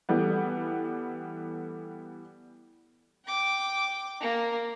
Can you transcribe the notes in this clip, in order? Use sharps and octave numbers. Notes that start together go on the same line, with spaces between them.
E3 G3 A3 B3
G5 D6
A#3